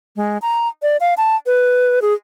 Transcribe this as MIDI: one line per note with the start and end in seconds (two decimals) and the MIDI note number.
0.16 0.38 56
0.42 0.68 82
0.82 0.97 74
1.00 1.14 77
1.17 1.36 81
1.46 1.99 71
2.02 2.14 68